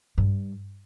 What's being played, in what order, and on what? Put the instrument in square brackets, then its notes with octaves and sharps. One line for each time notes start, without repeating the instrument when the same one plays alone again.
[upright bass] G2